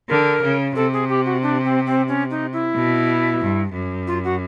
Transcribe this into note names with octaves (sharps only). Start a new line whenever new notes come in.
D3 A#4
C#3
C3 A4
G#4
G4
F#4
D4
C4
C4
C#4
D#4
E4
B2
G2
F#2
F4
F#4